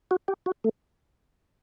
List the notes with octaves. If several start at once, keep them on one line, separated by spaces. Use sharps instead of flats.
F#4
G4
F#4
A3